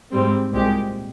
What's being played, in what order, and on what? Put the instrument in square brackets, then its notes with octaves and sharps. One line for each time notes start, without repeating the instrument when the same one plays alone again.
[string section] G#2 G3 C4
C2 A#2 G#3 C4 G4